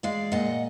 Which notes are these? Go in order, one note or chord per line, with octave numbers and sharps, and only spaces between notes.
G#3 D5 F5
A#2 D#5 F#5